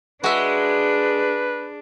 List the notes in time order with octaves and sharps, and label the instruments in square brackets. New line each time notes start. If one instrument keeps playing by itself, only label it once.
[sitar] G#3 [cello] D4 [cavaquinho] F#4 E5 [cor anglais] B4